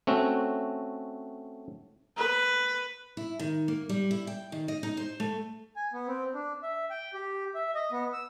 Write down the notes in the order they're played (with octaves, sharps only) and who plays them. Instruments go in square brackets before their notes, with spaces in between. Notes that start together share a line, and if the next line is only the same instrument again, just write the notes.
[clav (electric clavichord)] A3 C4 C#4 F#4
[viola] B4
[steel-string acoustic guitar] E4
D#3
A#3
G3
E4
G5
D#3
D#5
D#4
C5
A3
[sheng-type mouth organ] G#5
B3
C4
D4
E5
G5
G4
E5
D#5
B3
E6